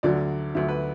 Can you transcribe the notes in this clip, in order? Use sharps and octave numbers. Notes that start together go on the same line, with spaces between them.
D2 D3 F#3 D5
D2 D3 F#3 E5
B4